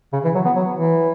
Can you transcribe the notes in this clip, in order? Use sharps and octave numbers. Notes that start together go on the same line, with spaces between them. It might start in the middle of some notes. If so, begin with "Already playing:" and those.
C#3
E3
F#3
B3
F#3
E3